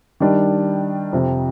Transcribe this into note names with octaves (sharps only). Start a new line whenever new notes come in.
D#3 G3 D4
F2 C3 F3